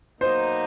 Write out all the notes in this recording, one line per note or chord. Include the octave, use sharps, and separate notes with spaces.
B2 F#3 A#3 D#4 C5